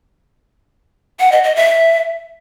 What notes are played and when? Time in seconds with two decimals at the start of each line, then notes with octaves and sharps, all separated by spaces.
1.20 F#5
1.32 D#5
1.44 D#5
1.56 E5